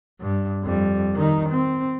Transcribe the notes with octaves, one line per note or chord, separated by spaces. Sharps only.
G2
F2 G3
D#3 D#4
C4